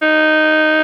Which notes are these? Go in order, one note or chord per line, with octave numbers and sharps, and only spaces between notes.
D#4